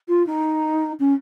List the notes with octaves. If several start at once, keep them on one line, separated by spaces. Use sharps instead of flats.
F4
D#4
C#4